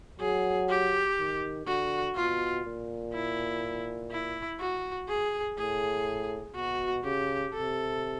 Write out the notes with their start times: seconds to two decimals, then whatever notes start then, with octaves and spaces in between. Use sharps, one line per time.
0.20 F#3 G#4
0.69 G4
1.18 D#3
1.66 D3 F#4
2.16 B2 F4
2.65 A#2
3.13 E4
4.11 E4
4.60 F#4
5.09 G#4
5.58 A2 G#4
6.55 B2 F#4
7.04 C#3 G4
7.53 C3 A4